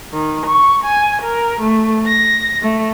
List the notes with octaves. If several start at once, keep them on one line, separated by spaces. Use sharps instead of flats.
D#3
C#6
G#5
A#4
A3
A#6
A3